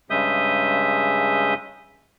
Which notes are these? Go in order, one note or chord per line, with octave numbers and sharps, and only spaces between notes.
G2 C#3 G#3 E5 D#6 G6